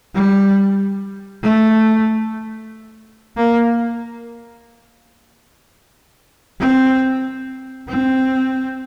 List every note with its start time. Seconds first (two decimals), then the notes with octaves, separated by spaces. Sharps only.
0.15 G3
1.43 A3
3.37 A#3
6.60 C4
7.88 C4